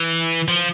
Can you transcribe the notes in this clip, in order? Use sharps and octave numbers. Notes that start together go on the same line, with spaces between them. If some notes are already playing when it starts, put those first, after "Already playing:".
Already playing: E3
F3